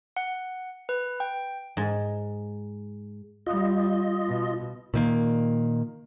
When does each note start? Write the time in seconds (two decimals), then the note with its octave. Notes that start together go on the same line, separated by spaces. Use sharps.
0.16 F#5
0.89 B4
1.20 G5
1.77 G#2
3.47 G3 F4 D#5
4.28 B2
4.94 A#2 D#3 A#3